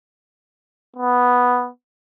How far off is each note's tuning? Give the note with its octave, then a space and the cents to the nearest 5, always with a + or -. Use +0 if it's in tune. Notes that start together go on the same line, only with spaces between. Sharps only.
B3 +0